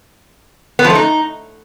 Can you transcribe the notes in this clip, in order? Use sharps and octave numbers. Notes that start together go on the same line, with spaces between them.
B3
F3
A3
D#4